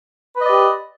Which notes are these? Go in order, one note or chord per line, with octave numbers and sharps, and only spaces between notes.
G4 B4 D5 D#5